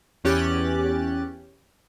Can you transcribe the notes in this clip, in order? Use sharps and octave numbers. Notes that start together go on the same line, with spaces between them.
E2 E3 C#4 G4 F#6 A6